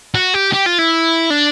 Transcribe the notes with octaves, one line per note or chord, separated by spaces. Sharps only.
F#4
G4
G4
F4
E4
D4